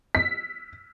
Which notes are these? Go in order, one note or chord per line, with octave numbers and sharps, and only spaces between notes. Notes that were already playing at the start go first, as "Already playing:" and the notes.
B6